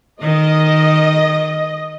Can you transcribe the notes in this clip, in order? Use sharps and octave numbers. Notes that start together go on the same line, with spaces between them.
D#3 D#5